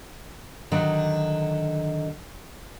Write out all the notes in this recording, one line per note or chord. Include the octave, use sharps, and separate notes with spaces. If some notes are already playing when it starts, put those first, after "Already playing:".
D3 D#3 F#3